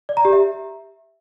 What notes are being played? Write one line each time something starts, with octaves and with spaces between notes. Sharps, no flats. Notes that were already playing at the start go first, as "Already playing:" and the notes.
D5
A#5
G4
E5